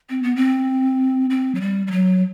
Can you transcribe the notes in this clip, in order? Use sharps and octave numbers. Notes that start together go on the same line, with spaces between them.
C4
B3
C4
C4
F#3
G3
G3
F#3